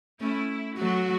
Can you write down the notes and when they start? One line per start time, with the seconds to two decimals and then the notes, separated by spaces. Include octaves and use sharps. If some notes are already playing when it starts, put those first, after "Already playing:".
0.20 A3 C#4 E4
0.78 F#3 A3 F#4